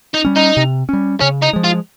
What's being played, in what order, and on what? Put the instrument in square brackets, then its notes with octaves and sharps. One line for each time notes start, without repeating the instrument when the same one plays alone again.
[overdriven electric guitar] D#4
[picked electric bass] G3 C#4
[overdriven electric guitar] D#4
[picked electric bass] C3
G3 C#4
[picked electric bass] C#3 [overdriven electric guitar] C#4
[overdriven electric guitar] D#4
[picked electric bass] F3 G#3
[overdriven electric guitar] F4